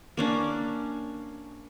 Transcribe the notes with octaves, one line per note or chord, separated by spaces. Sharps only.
A#3 C#4 D4